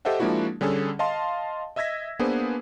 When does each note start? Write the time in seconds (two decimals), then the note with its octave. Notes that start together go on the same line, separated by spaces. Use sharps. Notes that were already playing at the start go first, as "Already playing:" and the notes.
0.05 G4 A4 C5 D#5 E5 F#5
0.20 F3 G#3 A#3 D4 E4 F#4
0.61 D3 G3 C#4 G#4 A4
0.99 D#5 F5 A5 C6
1.76 D#5 E5 E6 G#6 A#6 B6
2.19 A#3 B3 D4 G#4 B4 C5